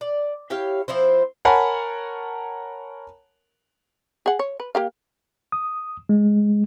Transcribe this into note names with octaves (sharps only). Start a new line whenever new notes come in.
D5
E4 G4 C#5 F5
F3 C4 E4 C5
A#4 C#5 F#5 G#5 A5 B5
G#4 F#5
C#5
B4
A#3 G4 F5
D#6
G#3